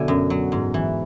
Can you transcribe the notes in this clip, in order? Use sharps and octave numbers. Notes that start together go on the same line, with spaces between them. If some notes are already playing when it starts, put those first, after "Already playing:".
Already playing: B2 D3 F#3 E5 G#5
F#2
F#3
G#2
E3